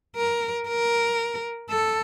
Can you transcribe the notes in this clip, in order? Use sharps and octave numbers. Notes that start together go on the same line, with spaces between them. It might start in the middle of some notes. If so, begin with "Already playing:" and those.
A#4
A#4
A4